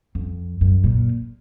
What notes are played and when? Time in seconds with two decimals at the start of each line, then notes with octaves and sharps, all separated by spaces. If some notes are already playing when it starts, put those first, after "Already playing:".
0.15 F2
0.61 F#2
0.84 A#2